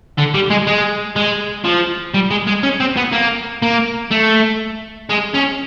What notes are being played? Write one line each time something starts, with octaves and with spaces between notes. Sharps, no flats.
D3
G3
G#3
G#3
G#3
F3
G3
G#3
G#3
C#4
C4
B3
A#3
A#3
A3
G#3
C#4